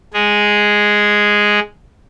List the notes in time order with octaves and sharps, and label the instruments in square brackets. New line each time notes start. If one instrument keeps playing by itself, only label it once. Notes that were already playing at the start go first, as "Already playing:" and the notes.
[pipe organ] G#3 G#4